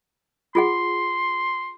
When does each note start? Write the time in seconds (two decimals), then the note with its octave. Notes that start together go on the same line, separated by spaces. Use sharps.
0.55 F4 G#4 F#5 C6